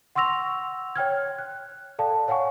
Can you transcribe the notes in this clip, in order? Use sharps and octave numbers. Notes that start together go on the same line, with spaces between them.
F#5 C6 C#6 E6 A#6 F7
C#5 G5 F6 G#6
F#6
A4 D5 F5 G5 A5
C#5 F5 F#5 G#5 C#6